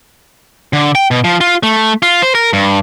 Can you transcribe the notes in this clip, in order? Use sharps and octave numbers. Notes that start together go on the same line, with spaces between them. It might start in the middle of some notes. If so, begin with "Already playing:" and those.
D3
G5
B2
F3
F4
A3
F4
C5
A#4
G2